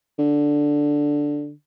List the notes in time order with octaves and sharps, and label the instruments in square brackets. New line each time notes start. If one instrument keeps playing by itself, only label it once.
[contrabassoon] D3